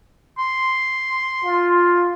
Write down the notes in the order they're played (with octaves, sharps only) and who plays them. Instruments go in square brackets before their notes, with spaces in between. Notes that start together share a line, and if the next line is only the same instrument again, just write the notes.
[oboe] C6
[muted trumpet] F4